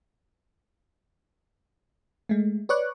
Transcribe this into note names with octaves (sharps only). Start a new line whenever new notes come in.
G#3 A3
B4 C#5 D5 C#6 D6 F#6